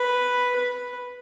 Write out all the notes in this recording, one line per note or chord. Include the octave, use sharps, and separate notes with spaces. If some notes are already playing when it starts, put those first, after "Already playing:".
Already playing: B4
B4